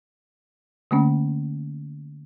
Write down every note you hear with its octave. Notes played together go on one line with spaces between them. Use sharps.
D3 A3 A#3 C4 C#4